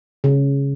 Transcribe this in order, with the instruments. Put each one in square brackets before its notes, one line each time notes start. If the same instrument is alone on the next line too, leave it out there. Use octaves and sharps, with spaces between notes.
[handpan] C#3